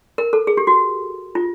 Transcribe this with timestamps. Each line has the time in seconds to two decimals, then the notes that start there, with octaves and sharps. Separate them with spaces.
0.18 A#4
0.33 A4
0.47 G#4
0.57 G4
0.67 F#4
1.35 F4